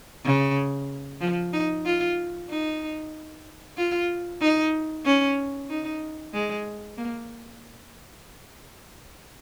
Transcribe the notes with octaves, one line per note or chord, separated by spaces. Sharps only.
C#3
F3
D#4
F4
D#4
F4
D#4
C#4
D#4
G#3
A#3